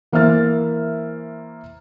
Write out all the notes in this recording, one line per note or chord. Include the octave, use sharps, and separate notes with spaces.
E3 A#3 C5 E5 F6 A6